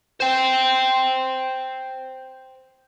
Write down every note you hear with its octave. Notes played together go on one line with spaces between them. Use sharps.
C5 G5